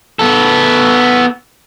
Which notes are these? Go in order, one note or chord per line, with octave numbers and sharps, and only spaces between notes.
B3 A4